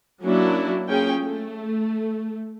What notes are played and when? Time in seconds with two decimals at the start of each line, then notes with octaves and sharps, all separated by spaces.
0.22 F#3 A#3 C#4 D4 E4 F#4
0.88 A#3 C#4 F4 G#4 G5
1.21 A3